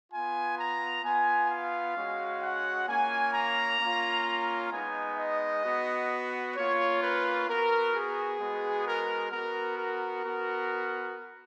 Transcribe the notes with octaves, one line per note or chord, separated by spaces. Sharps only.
B3 F4 G#5
A#5
B3 F4 G#5
F5
G#3 C#4 F#4
F#5
A#3 C#4 F4 G#5
A#5
A#3 C#4 F4
G#3 B3 D#4 G#5
D#5
B3 F#4
A#3 C#4 F4 C#5
B4
B3 F#4 A#4
G#4
G#3 B3 F#4
A#4
B3 F#4 A#4
A#4
B3 F#4